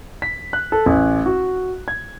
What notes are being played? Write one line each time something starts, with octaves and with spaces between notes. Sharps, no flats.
B6
F#6
A4
A1
F#4
G#6